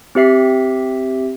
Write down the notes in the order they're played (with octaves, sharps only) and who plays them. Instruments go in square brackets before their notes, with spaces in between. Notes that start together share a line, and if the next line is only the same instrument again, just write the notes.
[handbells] C4 G4 E5 C7